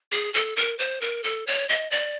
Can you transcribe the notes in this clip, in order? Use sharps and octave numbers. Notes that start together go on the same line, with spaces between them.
G#4
A4
A#4
C5
A#4
A4
C#5
D#5
D5